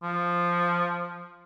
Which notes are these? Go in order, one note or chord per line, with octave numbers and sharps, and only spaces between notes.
F3